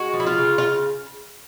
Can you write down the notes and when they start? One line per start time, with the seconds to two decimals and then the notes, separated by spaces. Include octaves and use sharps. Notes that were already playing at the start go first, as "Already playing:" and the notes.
Already playing: G#3 F#4
0.13 F3
0.20 E4
0.26 F4
0.38 C#3
0.58 F4